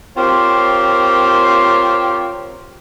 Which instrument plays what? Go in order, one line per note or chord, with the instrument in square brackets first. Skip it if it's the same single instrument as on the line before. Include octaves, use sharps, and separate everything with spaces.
[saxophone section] C4 F4 G4 A#4 C5 C#5